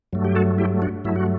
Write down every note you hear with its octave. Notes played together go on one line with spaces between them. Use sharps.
G2 F#3 A3
G4
F#4 A4
E4 G4
D4 F#4
G2 F#3 A3 E4
F#4